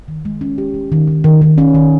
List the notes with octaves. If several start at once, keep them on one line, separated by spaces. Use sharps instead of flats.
D#3
G#3
C#4
G4
G#3
D#3
D#3
D#3
D#3
C#4
D#3